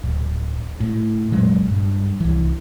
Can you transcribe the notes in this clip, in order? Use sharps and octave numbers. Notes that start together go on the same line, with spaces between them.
D1
A2
F1 A#2 F#3 G#3
G2
C2 E3